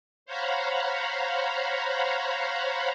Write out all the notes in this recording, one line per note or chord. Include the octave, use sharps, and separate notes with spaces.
C5 C#5 F5 F#5 A#5 B5